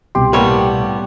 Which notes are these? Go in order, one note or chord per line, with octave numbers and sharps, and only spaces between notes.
C2 B2 G4 C6
A2 G3 A#3 B3 C#5